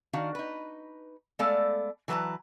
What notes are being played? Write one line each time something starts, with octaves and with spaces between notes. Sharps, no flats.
D#3 D4 F#4 F5
D#4 B4
G#3 A3 B3 A4 D5 F5
E3 F#3 B4 C5 A5 A#5